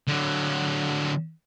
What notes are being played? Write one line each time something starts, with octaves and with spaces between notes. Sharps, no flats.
D3 F#3